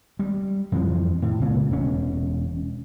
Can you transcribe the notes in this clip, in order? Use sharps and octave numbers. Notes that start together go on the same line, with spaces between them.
G3
F2 E3 F3
A2
C#2 A#2 C#3
E1 C#4